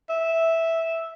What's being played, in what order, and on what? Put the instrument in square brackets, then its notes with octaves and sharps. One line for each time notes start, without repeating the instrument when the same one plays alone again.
[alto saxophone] E5